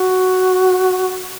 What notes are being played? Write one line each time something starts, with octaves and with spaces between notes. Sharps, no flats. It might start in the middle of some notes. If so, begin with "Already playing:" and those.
Already playing: F#4